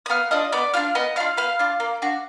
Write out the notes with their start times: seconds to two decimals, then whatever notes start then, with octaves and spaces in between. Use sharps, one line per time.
0.06 D#6
0.10 B3 F5 F6
0.31 D4 F4 D#5 D#6
0.52 B3 D5 D6
0.74 D4 F4 F5 F6
0.95 B3 D#5 D#6
1.16 D4 F4 F5 F6
1.37 B3 F5 F6
1.59 D4 F4
1.80 A#3
2.02 D4 F#4